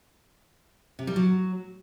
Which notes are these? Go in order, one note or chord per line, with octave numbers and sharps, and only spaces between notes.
C3
G3
F#3